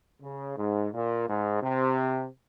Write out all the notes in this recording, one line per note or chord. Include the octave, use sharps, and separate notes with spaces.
C#3
G#2
A#2
G#2
C3